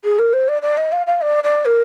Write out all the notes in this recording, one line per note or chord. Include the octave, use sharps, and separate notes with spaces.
G#4
A#4
C5
D5
D5
D#5
F5
F5
D5
D5
A#4